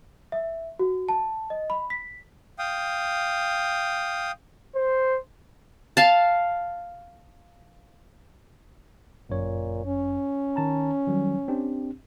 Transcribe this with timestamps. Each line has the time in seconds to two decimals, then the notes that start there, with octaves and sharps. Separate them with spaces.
0.32 E5
0.79 F#4
1.09 A5
1.50 D#5
1.70 B5
1.90 B6
2.59 F5 G5 D#6
4.75 C5
5.97 F5 A5
9.30 G1 F#2 A#2 C#5
9.86 C#4
10.56 D#3 A5 A#5
11.07 D#3 F#3 G3
11.48 C4 D4 G4